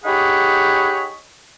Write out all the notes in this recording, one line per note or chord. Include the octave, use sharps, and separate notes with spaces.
D#4 G4 G#4 C#5 F#5 B5